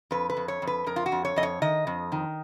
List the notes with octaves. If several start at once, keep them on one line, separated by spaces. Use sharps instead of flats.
F2 B4
B4
F2
C#5
F2
B4
F2 A#4
F4
F#4
F2
C#5
F2 D#5
C#5
D#3 D#5
F2
D#3